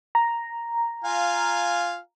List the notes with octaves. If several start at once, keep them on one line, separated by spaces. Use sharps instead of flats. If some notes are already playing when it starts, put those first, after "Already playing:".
A#5
F4 F5 G#5